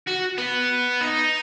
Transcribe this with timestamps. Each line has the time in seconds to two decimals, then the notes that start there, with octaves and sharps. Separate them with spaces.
0.08 F#4
0.38 B3
1.01 D#4